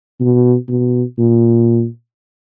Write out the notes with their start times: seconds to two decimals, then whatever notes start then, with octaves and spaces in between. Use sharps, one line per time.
0.20 B2
0.69 B2
1.18 A#2